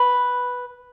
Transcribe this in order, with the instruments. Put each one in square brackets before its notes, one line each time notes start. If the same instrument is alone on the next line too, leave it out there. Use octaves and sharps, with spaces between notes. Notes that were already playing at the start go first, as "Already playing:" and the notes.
Already playing: [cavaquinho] B4